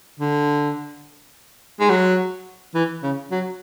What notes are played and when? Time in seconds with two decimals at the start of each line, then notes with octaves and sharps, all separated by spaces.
0.20 D3
1.80 G#3
1.90 F#3
2.75 E3
3.03 C#3
3.31 F#3